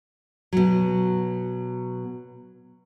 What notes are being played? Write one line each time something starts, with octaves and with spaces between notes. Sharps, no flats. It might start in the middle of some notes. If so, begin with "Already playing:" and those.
B2 F#3